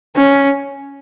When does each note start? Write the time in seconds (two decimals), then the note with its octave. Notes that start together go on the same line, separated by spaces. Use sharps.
0.16 C#4